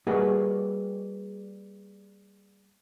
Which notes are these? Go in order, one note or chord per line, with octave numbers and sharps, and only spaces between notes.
G3 A#3 F#4 G#4 B4 D#5